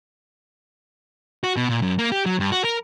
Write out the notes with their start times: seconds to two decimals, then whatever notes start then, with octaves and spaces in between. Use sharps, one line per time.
1.44 F#4
1.57 B2
1.69 A#2
1.82 F#2
1.99 A#3
2.12 G4
2.26 F#3
2.40 G2
2.52 F#4
2.64 A#4